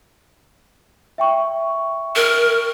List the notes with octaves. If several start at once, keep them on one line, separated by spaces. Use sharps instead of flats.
E5 G5 C#6
A#4